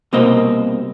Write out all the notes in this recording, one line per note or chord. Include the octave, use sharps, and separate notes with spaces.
C2 B2 A#3 C4 D#5